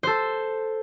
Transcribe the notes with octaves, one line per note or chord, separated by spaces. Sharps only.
A4 C5